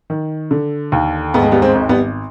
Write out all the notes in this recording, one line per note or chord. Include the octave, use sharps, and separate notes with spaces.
D#3
D3
D#2
G#2 B3
G#3
G3 B3
G#3 C4
G#1
G3 B3